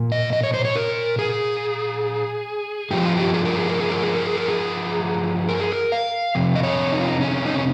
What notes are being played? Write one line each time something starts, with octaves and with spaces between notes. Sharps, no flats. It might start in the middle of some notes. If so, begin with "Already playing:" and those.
Already playing: A#2
D#5
D#5
C#5
C5
C#5
A#4
G#4
G2 F3 G4
F4
G4
G#4
A#4
G#4
A#4
G#4
A#4
G#4
A#4
G#4
A#4
G#4
A#4
G#4
A#4
F5
F2 C3
D#5
C#5
D#4
F4
D#4
C#4
D#4
C#4